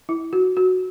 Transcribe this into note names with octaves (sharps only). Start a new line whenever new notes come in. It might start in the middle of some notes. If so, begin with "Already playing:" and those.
E4
F#4
F#4